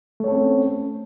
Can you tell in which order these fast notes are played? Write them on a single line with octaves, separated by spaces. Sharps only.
A3 C#5 A4 C4 C#4